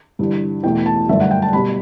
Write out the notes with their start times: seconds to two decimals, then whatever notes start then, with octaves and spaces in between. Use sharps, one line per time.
0.19 G1 G2 E3
0.63 E2 B2 A3 G5
0.86 A5
1.08 G1 F#2 D3 A3 E5
1.20 F#5
1.31 G5
1.42 A5
1.53 B2 G3 B5